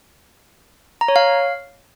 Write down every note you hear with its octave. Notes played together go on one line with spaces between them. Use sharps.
A#5
C#5
F5